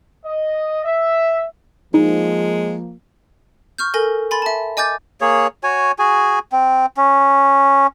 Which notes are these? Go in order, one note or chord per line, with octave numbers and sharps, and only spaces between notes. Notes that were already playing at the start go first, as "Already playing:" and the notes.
D#5
E5
F3 G#3 A#3 D#4
C#6 F6 G6
A4 A#4 G#5 A#6
G#5 B5 C6 A6
E5 A5
D#5 G#5 D6 G6 A6
A#3 G#4 C#5
F#4 C#5 G#5
F#4 G#4 G#5
C4
C#4